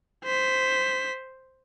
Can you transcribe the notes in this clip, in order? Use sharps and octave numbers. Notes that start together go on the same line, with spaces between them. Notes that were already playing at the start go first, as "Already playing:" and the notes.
C5 B6